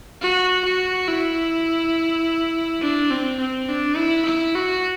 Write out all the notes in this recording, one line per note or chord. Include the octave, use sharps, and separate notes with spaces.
F#4
F#4
E4
D4
C4
C4
D4
E4
E4
F#4